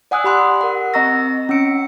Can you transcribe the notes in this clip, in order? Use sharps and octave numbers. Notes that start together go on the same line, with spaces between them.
D5 F#5 G#5 D#6 E6 F#6
G4 B5 C6 F#6
A#4 F#5
C4 D#5 A#5 C#6 E6 A#6
C#4 F#5 E6 C#7 D7